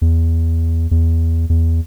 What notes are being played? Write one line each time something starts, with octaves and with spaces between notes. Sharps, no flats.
E2
E2
E2